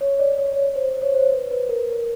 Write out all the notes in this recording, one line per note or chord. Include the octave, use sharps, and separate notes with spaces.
C#5
D5
C#5
D5
C#5
C5
C5
C#5
C5
B4
B4
A#4